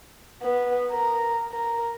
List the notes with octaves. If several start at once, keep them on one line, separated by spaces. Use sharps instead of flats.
B3
A#4
A#4